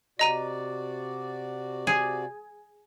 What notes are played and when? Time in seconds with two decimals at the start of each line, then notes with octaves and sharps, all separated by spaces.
0.19 C3 F#4 D5 D#5 A#5 D#7
1.87 G#4